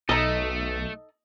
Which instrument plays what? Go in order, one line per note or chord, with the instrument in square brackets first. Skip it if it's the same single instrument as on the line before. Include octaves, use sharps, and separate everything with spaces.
[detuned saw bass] B1 [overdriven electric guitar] A3 [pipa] D#4 A4 [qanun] D#5